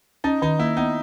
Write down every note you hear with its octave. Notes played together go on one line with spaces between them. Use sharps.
C#4 D#4
D#3 D#4
A#3 E4
B3 D#4